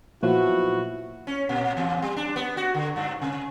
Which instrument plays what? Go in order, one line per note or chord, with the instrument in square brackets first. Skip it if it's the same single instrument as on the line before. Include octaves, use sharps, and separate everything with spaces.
[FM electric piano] A#2 F3 F#3 [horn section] B3 E4 F#4
[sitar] C#4
A#2
E2
G3
D4
B3
F#4
D3
G2
C3